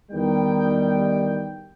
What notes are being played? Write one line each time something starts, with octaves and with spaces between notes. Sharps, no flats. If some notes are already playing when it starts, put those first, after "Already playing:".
E2 D#3 G3 G5